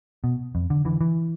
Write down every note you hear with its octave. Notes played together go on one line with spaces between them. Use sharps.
B2
F2
D3
D3 E3
E3